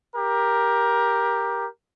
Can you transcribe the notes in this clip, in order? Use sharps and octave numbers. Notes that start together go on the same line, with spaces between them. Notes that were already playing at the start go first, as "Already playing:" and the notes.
G4 A#4